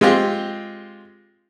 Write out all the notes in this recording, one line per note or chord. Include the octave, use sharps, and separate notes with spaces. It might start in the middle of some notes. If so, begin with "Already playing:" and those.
G#3 C4 F4 G4